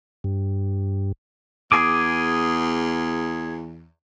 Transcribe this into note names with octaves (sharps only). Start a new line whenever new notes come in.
G2
E2 G#4 G#5 D6